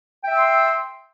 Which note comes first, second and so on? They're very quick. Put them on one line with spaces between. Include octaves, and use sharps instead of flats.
G5 E5 E6 C6